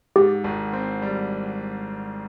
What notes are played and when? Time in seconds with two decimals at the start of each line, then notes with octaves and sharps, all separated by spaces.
0.16 G#2 G4
0.44 G#1
0.73 C4
1.02 G3